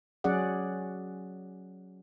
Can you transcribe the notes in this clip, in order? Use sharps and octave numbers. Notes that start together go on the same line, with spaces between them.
F#3 C#4 G#4 D5 F#5